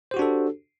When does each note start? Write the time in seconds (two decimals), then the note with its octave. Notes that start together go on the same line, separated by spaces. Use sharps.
0.11 C5
0.14 G4
0.17 F#4
0.19 D4
0.22 A4